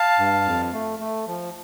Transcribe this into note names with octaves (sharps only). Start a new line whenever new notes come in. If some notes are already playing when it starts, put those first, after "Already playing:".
Already playing: F5 A5
G2
F2
A3
A3
F3